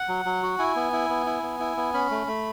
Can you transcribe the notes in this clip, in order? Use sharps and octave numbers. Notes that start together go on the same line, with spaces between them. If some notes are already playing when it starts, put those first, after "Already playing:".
Already playing: F#5
F#3
F#3
F#4
E4 G#5
B3
E4
B3
E4
B3
E4
B3
C#4 B5
A3
A3